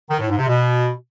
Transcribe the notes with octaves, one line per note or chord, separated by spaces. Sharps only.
D#3
A2
G#2
C3
B2